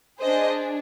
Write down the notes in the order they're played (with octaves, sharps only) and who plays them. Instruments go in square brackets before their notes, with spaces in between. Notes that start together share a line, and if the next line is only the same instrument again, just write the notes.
[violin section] D4 G#4 C5 D#5